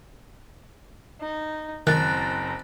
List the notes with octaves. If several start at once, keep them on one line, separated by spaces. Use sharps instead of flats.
D#4
F#1 D#3 C4 A#5 F#6 A6